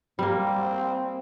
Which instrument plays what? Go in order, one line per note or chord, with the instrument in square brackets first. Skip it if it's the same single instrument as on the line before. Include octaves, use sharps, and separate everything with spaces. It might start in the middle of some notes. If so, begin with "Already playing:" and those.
[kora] G3 A#3 [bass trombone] C4